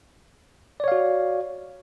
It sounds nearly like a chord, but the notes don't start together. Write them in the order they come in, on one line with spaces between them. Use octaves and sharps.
D5 C#5 F5 F#4